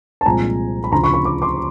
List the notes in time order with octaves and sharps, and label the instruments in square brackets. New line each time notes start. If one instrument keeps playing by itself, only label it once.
[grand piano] A5
C2 A#2 F3 G#3 C4 G#5 A#5
B5
D2 C#3 F3 A#5 C6
B5 C#6
B5 C#6
D6
C6 D6